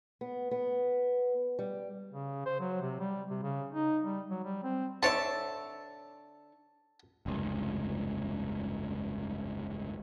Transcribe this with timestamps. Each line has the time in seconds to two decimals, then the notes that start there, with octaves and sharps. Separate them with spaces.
0.21 B3
0.51 B3
1.59 G3
2.11 C#3
2.46 C5
2.60 F#3
2.82 C3
3.00 G3
3.30 C3
3.43 C#3
3.70 D#4
4.04 G3
4.30 F#3
4.44 G3
4.63 C4
5.03 D3 C#5 E5 A5
7.26 F1 C#2 G2